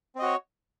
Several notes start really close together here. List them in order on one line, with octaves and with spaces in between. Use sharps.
C4 D#5 F#4 C#5